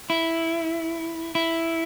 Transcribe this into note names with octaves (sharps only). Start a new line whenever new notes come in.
E4
E4